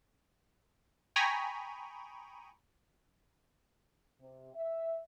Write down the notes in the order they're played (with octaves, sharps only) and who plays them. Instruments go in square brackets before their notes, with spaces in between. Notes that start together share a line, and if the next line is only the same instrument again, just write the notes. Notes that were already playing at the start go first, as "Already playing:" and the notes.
[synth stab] G5 G#5 A#5 B5 C#6 D#6
[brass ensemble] C3
E5